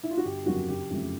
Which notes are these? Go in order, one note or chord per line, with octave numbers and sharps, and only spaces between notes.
E4
F4
F#4
G1 G4
F2 C#3 F#3 A#3 F#4
F#1 G4
F2 C#3 F#3 A3